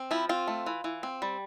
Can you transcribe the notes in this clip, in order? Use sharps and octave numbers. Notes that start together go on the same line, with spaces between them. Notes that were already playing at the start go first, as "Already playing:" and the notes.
Already playing: C4
F3 E4
C4 F4
A3
E3
E3
C4
G3